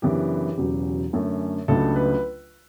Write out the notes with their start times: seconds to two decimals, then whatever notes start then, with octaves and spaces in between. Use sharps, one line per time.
0.02 F#2 C#3 E3 B3 D4 G4
0.57 E1 E2 C#3 F#3 C#4
1.13 F#2 D3 A3 C#4
1.68 C#2 C#3 F#3 A3 D4 A4
1.96 B4